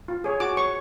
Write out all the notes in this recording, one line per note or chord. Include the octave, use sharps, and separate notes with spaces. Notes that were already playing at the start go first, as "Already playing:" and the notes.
F4
G#4 C#5
F#4 D6
C#5 C#6